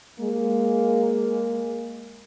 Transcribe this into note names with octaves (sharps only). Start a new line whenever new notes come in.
G#3 A#3